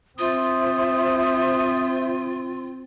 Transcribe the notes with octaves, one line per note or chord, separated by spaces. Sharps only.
C4 F4 C5 E5 D#6